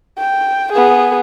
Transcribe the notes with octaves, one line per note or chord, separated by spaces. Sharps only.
G5
B3 G#4